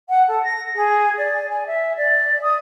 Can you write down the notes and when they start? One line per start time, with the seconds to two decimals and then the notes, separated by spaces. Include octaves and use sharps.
0.09 F#5
0.27 A4
0.43 A#6
0.75 G#4
1.17 D5
1.49 G#5
1.66 E5
1.96 D5
2.42 D#6